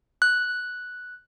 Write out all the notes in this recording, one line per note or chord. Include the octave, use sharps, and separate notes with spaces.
F#6